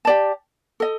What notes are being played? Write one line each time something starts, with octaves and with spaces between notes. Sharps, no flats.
G4 D5 A5
A4 D#5